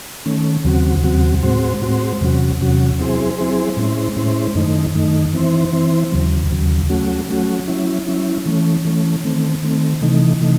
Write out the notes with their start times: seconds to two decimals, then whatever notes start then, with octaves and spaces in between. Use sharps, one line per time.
0.26 D#3 A3 C#4
0.65 D#2 C#3 F#3 C4 F#4
1.04 D#2 C#3 F#3 C4 F#4
1.43 A2 G#3 C4 F#4 C5
1.81 A2 G#3 C4 F#4 C5
2.21 E2 C3 F#3 C#4 F#4
2.60 E2 C3 F#3 C#4 F#4
2.99 F#3 C4 E4 G#4 C5
3.38 F#3 C4 E4 G#4 C5
3.77 A2 G#3 C#4 E4 C5
4.16 A2 G#3 C#4 E4 C5
4.55 F#2 D#3 A3 D#4
4.94 F#2 D#3 A3 D#4
5.33 E3 C4 E4 C5
5.73 E3 C4 E4 C5
6.12 D#2 C#3 F#3
6.51 D#2 C#3 F#3
6.89 F#3 A3 C#4 F#4
7.29 F#3 A3 C#4 F#4
7.68 F#3 C#4 E4
8.07 F#3 C#4 E4
8.46 E3 A3 C#4
8.85 E3 A3 C#4
9.24 D#3 A3 C4
9.63 D#3 A3 C4
10.02 C3 E3 A3 D#4
10.41 C3 E3 A3 D#4